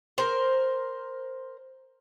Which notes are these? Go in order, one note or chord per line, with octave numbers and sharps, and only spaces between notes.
A#4 C5